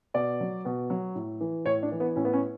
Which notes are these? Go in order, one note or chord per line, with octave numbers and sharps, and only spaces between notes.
B2 D5
F#3
B2
F#3
A2
E3
A2 C#5
D4
E3
B3
A2 C#4
B3
C#4